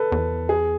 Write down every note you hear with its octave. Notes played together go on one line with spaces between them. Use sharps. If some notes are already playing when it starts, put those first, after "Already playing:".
Already playing: A4 B4
E2
G#4